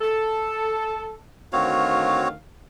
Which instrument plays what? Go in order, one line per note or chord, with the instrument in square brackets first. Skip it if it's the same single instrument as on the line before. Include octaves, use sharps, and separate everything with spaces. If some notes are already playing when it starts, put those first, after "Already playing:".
[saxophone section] A4
[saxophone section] D2 D#3 F5 [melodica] C4 F#4 C#5